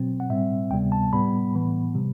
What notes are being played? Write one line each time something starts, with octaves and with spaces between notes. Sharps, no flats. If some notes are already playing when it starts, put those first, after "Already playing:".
Already playing: B2 F#3 C4
F#5
A2 G3 C4 E5
D2 C3 G3 B3 G5
A5
A2 G3 B3 B5
A2 E3 B3
C3 G3